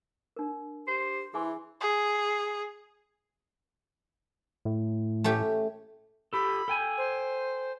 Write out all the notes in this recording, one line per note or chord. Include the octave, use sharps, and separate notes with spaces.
D4 A#4
G4 C5
E3 E4 G#4 G#5 C6
G#4
A2
A3 C#4 G4
G4 A4 B5
A4 G5 G#5
C5